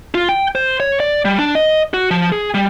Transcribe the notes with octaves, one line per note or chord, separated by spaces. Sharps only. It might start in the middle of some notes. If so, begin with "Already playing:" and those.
F4
G5
C5
C#5
D5
G3
D4
D#5
F#4
F3
G#4
G3